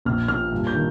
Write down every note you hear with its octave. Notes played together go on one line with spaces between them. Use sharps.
A#1 F6
A#2 F6
G2
G6
D#3